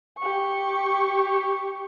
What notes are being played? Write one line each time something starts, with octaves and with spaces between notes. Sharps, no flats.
G4 C#6